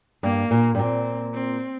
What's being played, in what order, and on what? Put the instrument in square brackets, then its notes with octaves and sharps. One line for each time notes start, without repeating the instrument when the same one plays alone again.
[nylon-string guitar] G2 [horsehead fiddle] A#3
[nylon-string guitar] A#2
G2
[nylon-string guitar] A#2 [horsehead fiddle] C4
[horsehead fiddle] C4